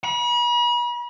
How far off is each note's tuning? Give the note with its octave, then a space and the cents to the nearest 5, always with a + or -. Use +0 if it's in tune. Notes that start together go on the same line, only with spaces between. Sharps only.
B5 -40